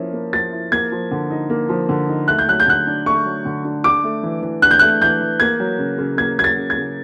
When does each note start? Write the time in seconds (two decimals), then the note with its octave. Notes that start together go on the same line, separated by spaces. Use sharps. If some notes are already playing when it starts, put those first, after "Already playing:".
Already playing: F3 A#3 C#4 E4
0.13 A#3
0.33 F3 A6
0.52 E4
0.72 A#3 G#6
0.92 F3
1.11 D3
1.30 D#4
1.50 A#3
1.69 F3
1.89 D3
2.09 D#4
2.28 A3 F#6
2.39 G6
2.48 F#3 F#6
2.60 G6
2.67 D3 F#6
2.87 D4
3.06 A3 C#6
3.25 F#3
3.45 D3
3.65 D4
3.84 D4 D6
4.04 A3
4.23 E3
4.42 E3
4.62 D4 F#6
4.71 G6
4.79 A3 F#6
5.01 E3 G6
5.21 E3
5.40 A#3 G#6
5.60 F#3
5.79 C#3
5.98 C#3
6.17 A#3 G#6
6.38 F#3 G#6
6.44 A6
6.57 C#3
6.70 G#6
6.77 C#3